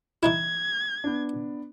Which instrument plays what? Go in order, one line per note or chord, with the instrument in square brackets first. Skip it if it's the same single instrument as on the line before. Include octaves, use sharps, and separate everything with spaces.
[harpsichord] E3 D#4 E4 [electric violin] G#6
[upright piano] B3 D4